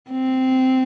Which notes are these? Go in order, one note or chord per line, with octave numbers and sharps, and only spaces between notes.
C4